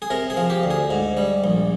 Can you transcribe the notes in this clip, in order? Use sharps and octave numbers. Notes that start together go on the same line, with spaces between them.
G#4
C3 A#4
G#4
F3
G4
D2
G#4
G#2
G3
A#1